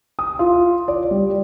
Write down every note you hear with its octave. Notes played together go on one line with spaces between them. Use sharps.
D#6
F4
D5
G3